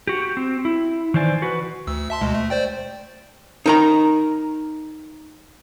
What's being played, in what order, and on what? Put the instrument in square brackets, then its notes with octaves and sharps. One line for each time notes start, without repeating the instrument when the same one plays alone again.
[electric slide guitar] F#4 G4
C4
E4
D#3 E3 C5 D5 G#5
F#4 B4
[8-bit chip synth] D2 E6
E5 A5 C6
D2 B2 G#3
A3
C5 D5 G5
[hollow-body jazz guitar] D#4 A#4 A#5